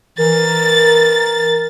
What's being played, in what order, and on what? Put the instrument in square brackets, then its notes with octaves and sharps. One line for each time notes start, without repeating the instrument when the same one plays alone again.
[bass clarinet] E3 [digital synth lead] A#4 [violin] A6